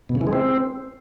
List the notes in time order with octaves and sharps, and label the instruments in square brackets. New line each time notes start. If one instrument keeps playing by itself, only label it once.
[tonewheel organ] B2
C#3
E3
G#3
C4